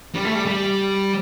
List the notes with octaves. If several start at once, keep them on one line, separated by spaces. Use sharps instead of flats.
G3
A3
G3
G3